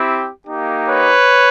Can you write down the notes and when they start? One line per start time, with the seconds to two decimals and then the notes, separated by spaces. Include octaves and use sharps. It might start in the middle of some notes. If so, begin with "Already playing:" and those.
Already playing: C4 E4 G4
0.46 A#3 D#4 G4
0.88 B4 C#5